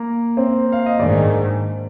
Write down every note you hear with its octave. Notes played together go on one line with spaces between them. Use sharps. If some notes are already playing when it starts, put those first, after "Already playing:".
Already playing: A#3 A#4
C4 C5
F5
D#5
G#2 D#3 D4 D5